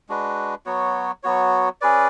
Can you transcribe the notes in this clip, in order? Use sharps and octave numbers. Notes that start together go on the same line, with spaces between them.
G#3 D4 F#4 B4
F#3 B3 F#4 C#5
F#3 B3 F#4 C#5
C#4 G#4 B4 D5